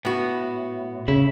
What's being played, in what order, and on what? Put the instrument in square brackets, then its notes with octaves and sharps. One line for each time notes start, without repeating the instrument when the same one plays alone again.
[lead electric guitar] A2 [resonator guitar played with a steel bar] B3 F#4
[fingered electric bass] C#3 [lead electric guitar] E5 B5